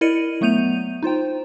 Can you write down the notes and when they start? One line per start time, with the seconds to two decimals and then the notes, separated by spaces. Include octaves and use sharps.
0.01 E4 A#4 D5 D#5 C#7 D#7
0.41 F#3 A3 B3 G6 D#7 F7
1.03 D#4 F4 C5 G5